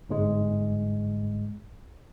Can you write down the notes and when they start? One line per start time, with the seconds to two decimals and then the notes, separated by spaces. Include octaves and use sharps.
0.09 G1 G#2 G#3